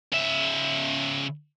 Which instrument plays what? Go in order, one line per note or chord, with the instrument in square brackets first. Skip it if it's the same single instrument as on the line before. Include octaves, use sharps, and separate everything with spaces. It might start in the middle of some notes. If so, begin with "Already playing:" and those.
[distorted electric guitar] C#3 E5